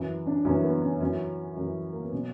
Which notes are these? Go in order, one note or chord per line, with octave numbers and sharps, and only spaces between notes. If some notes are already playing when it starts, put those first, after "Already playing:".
Already playing: F#2 E3
D4
F#2 E3 C#4
B3
C#4
F#2 E3 C#4
F#2 E3
A#3
B3
B2 F#3 C#4